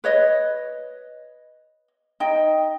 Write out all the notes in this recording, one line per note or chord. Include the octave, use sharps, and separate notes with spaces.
B4 C#5 D#5
D#4 D#5 G5